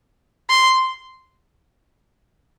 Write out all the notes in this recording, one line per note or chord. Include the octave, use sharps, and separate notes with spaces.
C6